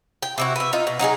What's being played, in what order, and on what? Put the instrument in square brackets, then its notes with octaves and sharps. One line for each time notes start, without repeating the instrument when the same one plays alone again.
[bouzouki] G5
C3 E4 F#4
B4 E5
D#4 F4
B2
F#3 D#4 F#4 G#4